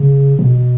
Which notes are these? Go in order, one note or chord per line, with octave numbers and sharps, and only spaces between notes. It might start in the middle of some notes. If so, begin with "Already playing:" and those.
Already playing: C#3
B2